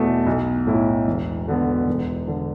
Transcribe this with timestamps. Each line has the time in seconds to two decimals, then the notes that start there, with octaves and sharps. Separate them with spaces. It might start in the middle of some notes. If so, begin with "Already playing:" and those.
Already playing: E2 B2 A3
0.26 B1
0.67 A2 A3 E4
1.07 E1
1.47 D2 D3 B3
1.87 E1
2.27 D3